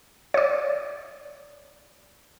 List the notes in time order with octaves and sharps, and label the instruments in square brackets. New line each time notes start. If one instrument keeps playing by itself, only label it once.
[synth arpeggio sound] C#5 D5